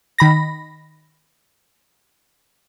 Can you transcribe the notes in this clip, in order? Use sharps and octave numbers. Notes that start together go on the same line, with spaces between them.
D#3 B5 A#6